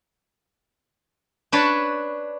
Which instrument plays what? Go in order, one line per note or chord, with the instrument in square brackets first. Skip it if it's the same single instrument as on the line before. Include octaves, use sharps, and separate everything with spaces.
[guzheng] D4 B4 C#5 A5